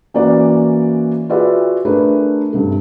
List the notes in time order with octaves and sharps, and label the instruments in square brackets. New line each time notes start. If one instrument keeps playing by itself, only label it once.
[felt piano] E3 A#3 C#4 F#4 D5
F4 F#4 G#4 B4 D5 E5
A3 D4 G#4 A#4 B4
G2 C3 A4